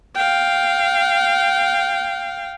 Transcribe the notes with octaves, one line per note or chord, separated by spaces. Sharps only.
F5 G5